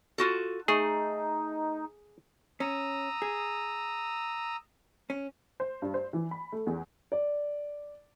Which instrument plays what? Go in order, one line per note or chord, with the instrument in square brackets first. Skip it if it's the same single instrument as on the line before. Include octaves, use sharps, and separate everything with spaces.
[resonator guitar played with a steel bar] F4 F#4 A4
[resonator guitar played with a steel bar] A3 [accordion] D#4 [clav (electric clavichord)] G#4
[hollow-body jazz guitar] C#4 [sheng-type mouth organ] A#5 D#6 E6
[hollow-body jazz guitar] G#4
C#4
[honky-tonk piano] C5
G2
C5
E3
B5
A3
E2
[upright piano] D5